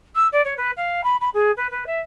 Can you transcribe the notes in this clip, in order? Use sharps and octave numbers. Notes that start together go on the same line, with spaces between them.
E6
D5
C#5
B4
F5
B5
B5
G#4
B4
B4
E5